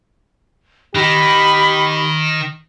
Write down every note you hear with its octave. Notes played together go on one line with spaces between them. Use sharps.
D#3 D#4 G4 B5